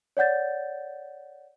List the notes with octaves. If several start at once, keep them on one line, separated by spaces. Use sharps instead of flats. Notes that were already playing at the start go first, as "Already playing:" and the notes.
C#5 D5 F#5 G6 A6